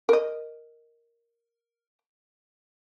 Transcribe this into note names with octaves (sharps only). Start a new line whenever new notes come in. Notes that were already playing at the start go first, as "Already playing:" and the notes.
A#4 D#5